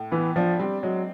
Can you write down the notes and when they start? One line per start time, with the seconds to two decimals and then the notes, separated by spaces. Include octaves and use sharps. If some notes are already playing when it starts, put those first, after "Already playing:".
Already playing: A2
0.11 E3 B3
0.36 F3 D4
0.59 G3 C4
0.83 F#3 G#3